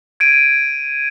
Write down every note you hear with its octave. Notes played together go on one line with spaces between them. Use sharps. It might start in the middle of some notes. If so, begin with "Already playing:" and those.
G#6 D7 D#7